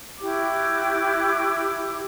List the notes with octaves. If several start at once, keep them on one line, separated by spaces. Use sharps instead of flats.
E4 F#4 G4 D6